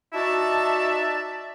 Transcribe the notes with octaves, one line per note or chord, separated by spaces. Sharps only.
D#4 F#4 D5 E5 A5